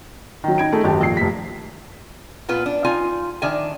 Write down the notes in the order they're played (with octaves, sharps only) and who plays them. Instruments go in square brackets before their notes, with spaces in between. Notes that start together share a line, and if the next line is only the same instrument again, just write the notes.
[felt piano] D#3 F#3
D#4 G#6 D7
A3 D#4 G#4
G#1 F#2 D#3 G4 A5
A#1 C7
F1 B6
[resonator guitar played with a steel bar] A#2 B3 F4 B4
D4
D#4 F4 G#5
D#3 D4 E5 G#5